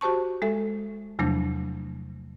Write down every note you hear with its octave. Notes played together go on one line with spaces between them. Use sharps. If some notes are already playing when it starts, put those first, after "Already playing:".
F#4 G4 C5 A5 C#6
G#3 A4 E5
E2 C3 F3 F#3 A3 D4